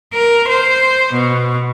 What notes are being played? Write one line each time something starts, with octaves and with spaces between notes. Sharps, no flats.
A#4
C5
B2